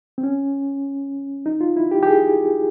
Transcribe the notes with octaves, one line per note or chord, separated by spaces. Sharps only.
C4
C#4
D#4
F4
E4
G4
G4
G#4